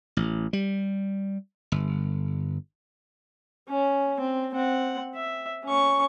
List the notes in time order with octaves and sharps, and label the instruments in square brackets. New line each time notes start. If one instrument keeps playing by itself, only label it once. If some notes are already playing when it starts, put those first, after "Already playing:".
[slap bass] A1
G3
G1
[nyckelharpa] C#4
C4
C4 F#5
E5
C#4 C#6